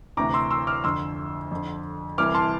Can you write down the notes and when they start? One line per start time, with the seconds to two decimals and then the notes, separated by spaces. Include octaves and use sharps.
0.17 D2 C3 E3 A#5 D6
0.34 C6 E6
0.51 C6 E6
0.67 D6 F6
0.84 F2 D3 C6 E6
1.51 F2 D3
2.18 C2 C3 E3 D6 F6
2.34 A5 C6